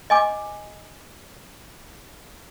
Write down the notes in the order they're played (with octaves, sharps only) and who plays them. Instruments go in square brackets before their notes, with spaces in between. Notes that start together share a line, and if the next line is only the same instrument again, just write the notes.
[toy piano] D#5 G#5 D6